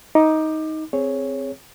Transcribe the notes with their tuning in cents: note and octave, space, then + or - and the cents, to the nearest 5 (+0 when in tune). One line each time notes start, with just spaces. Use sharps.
D#4 +15 D6 +25
C4 +0 G#4 +0 C#5 +0